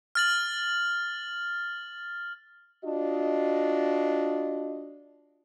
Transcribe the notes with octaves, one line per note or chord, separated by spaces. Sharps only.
F6 A6 F#7
D4 F4 F#4 D#5